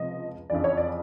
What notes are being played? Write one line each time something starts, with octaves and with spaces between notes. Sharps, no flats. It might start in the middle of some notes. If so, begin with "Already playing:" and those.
Already playing: C#2 C3 F3 D#5
F2 C#3 E3 D5
C#5
D5